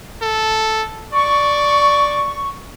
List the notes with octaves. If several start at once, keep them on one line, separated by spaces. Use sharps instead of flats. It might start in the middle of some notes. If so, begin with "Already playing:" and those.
A4
D5 C#6